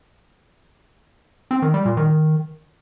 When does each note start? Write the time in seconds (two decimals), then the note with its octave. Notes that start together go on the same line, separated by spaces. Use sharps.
1.51 C4
1.62 D#3
1.74 G3
1.85 A#2
1.97 D#3